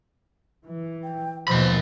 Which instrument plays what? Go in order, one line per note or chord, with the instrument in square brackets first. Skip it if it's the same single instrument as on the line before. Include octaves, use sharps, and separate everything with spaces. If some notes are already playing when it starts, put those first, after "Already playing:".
[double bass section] E3
[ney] G5
[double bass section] D#2 B2 F3 [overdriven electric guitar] D#3 B5 [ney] C5